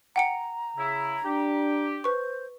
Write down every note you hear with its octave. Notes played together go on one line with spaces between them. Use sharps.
F#5 G5 A#5 C#7
C#3 E4
D4 G4
B4 C5 C#6